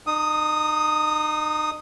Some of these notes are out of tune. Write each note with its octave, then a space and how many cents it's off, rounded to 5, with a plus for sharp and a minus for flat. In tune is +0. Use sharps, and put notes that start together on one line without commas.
D#4 -35 D#6 +0